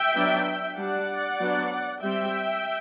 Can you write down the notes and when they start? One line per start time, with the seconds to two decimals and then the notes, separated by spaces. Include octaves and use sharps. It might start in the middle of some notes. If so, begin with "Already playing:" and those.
Already playing: E5 G5
0.15 F#3 B3 D4
0.78 G3 D4 D5 F#5
1.40 F#3 B3 D4
2.02 G3 C4 E5 G5